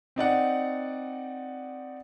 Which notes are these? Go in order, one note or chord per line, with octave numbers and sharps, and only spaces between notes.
C4 D#4 D5 F#5